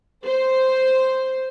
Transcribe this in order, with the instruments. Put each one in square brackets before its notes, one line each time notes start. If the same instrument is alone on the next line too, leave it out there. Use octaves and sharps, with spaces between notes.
[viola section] C5